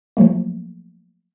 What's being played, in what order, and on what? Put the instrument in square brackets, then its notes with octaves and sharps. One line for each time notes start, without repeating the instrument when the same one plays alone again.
[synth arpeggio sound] F3 F#3 A3 A#3